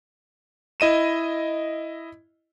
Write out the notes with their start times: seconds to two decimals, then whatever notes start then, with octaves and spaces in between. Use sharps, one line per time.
0.80 E4 D#5 D#7 E7